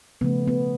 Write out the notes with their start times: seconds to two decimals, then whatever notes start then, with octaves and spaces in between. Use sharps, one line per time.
0.21 C#3 F3 A3 B3
0.47 B3